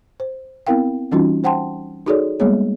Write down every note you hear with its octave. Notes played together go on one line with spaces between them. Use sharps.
C5
B3 C4 E4 A#4 F5 G5
E3 G3 C#4 D#4 F4 F#4
C5 F#5 G5 A5 C6
D#4 F#4 G#4 A4 C#5 D5
G3 G#3 A#3 B3 G#4 C#5